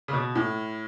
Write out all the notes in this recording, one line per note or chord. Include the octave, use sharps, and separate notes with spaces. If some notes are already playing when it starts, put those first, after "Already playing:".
C#3
B2
A2